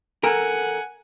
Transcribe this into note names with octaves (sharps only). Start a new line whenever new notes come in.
A4 A#4 F#5 G#5